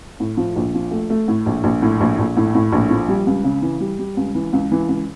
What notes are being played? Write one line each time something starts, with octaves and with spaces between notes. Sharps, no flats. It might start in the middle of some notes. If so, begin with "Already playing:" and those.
A2
F3
A#1
F3
A3
A3
A2
A#1
A#1
A2
A#1
A#1
A2
A2
A#1
F3
G3
C#2
C#3
E3
G3
G3
C#2
E3
C#2
E3
C#2